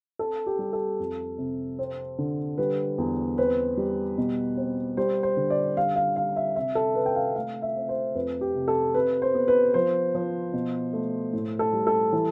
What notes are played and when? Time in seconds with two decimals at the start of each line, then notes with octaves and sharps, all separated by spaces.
0.19 C4 A4
0.46 G4
0.59 G3
0.73 A4
0.99 F2
1.38 C3
1.79 C4
2.18 D3
2.58 G3 B4
2.98 E2
3.38 C4 B4
3.77 G3
4.18 B2
4.57 C4
4.97 G3 C5
5.23 C5
5.37 D3
5.50 D5
5.77 G3 F5
5.96 F5
6.16 G3 F5
6.36 E5
6.56 C3 E5
6.75 A4
6.95 C3 B4
7.06 G5
7.15 F5
7.36 A3 F5
7.62 E5
7.76 C4
7.89 C5
8.15 F2 B4
8.41 G4
8.55 C3
8.68 A4
8.94 C3 B4
9.22 C5
9.35 B3
9.48 B4
9.74 F3 C5
10.15 F3
10.53 B2
10.93 A3
11.33 A2
11.59 A4
11.73 G3
11.87 A4
12.13 E3